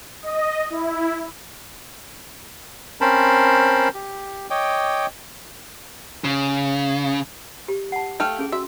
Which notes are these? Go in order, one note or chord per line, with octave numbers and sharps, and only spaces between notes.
D#5
E4
C4 C#4 A#4 C5 A5 B5
G4
C#5 D#5 G5 D6
C#3
G4
F#5 A5
A3 F5 G5
C#4 G#4
F#4 E5